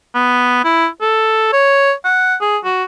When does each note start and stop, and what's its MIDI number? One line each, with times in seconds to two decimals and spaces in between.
0.15 0.64 59
0.64 0.87 64
1.01 1.49 69
1.53 1.93 73
2.05 2.35 78
2.41 2.58 68
2.65 2.84 66